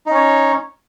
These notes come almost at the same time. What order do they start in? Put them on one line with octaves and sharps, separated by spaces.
D#4 C#4 C#5